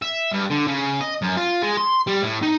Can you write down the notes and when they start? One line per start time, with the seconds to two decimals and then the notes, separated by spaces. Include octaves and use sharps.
0.02 E5
0.32 G2
0.50 D3
0.67 C#3
1.01 D#5
1.22 F#2
1.37 F4
1.62 G#3
1.77 C6
2.07 G3
2.22 A2
2.42 D#4